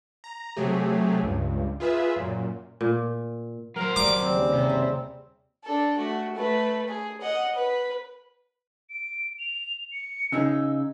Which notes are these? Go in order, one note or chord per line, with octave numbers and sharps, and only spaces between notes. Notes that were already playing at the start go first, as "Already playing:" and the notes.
A#5
C3 F#3 A3 G4 G#4
C#2 G2
F4 G#4 B4 E5
F#2 A#2
A#2
F#3 A#4 C5
G3 D6
D#2 C#3 G3 C4
C3
D4 A4
A3 F#4
A3 B4
G#4
D#5 F#5
B4
D7
F7
C#7
C#3 D#4 G#4 E6